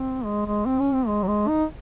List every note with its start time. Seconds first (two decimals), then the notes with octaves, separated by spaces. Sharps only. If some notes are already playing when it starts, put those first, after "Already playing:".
Already playing: C4
0.25 G#3
0.46 G#3
0.66 C4
0.79 C#4
0.93 C4
1.08 G#3
1.23 F#3
1.28 G#3
1.48 D#4